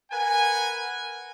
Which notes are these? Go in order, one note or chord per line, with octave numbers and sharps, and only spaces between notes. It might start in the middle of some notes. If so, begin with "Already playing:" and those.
A#4 B4 F#5 G#5